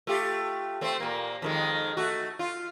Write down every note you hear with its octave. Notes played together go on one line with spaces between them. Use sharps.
A3 F4 G4
A3 C4 C5
A#2 A#3
F2 D#3 G#3
A3 F#4
F4